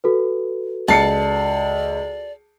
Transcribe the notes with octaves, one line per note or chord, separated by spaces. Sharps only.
F#4 A4 B4
C#2 D5 A5 C7 C#7